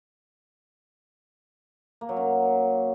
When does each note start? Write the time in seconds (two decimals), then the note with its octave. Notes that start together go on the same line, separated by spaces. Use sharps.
2.01 A#3
2.09 F#3
2.17 F#2